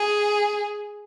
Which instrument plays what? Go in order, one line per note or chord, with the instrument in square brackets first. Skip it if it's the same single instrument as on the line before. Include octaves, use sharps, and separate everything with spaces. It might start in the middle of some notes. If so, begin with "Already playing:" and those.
Already playing: [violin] G#4